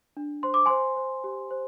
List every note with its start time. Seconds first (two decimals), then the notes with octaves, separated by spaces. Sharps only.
0.17 D4
0.43 C5 C6
0.54 D6
0.66 C5 G#5 C6
0.96 C5
1.24 G4
1.51 C5